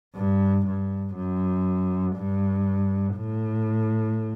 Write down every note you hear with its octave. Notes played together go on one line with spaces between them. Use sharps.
G2
G2
F#2
G2
A2